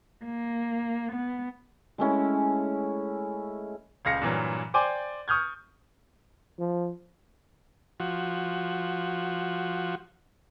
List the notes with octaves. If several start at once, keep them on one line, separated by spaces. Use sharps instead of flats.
A#3
B3
G#3 A3 C#4 E4
D#1 C#2 F5 A#6 C#7
G2 A#2 E3 F#3
C5 D5 G5 G#5 C6 D6
C#6 D#6 F6 G6 G#6
F3
F3 F#4